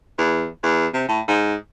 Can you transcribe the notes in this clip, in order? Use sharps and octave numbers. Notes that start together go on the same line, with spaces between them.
E2
E2
C3
A2
G#2